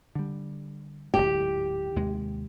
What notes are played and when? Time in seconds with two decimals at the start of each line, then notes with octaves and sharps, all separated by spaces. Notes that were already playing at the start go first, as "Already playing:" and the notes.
0.15 D3 G3
1.14 D1 G#1 G#2 G4
1.96 D#2 C3 G#3